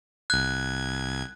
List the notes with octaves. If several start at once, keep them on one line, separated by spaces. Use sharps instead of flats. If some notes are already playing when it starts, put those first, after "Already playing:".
C2 F#6 G#6